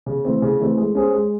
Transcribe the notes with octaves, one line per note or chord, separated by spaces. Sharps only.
C#3
E3 A3 C4
C#3
E3 A3 C4
G#3
C#4 G#4 C5
G#3